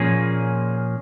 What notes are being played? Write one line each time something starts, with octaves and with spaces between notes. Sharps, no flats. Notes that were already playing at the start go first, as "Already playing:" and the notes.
Already playing: A#2 F3 A#3 C#4 G#4